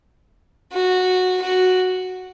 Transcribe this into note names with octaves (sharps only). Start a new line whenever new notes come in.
F#4
F#4